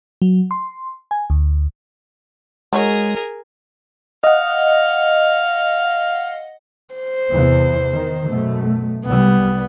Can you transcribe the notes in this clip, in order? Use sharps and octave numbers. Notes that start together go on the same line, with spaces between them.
F#3
C6
G#5
D2
F#3 G#3 D#4 G#4 A#4 C#5
D#5 F5 F#5
C5
E2 C3 E3
D#3
F#2 B2 A3
C2 G3 B3